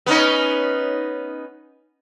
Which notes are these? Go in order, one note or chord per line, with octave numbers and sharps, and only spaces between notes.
B3 C#4 D#4